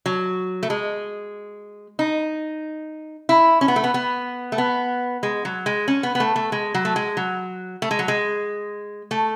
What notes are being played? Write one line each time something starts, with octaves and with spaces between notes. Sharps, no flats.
F#3
A3
G#3
D#4
E4
C#4
B3
A3
B3
B3
A3
B3
G#3
F#3
G#3
C#4
B3
B3
A3
A3
G#3
F#3
A3
G#3
F#3
A3
G#3
F#3
G#3
A3